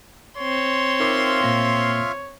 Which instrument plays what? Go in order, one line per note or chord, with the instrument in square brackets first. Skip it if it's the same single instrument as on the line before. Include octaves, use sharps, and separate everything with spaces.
[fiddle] C4 C6 [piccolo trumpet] C#5
[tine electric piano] D#4 A#4 D6 [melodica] F4 E5 F5
[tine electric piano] A#2 A#3 A#6